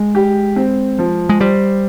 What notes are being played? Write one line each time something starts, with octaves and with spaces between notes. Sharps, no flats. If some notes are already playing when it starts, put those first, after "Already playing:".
Already playing: G#3
G4
C4
F3
G#3
G3 C5